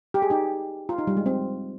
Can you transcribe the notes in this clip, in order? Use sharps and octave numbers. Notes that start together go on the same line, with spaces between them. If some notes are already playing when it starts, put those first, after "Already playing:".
G4
G#4
D#4 G4
F4
D#4
G3
G#3
C4